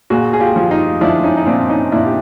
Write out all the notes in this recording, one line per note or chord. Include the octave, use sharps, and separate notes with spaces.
A#2 F#4 G#4
G#4
F4 G4
F3
D#4 F4
F3 D4 E4
C#4 D#4
D#4
A#2 C4 D4
C#4 D#4
A#2 D4 E4
G4